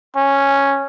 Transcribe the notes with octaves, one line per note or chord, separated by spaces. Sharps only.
C#4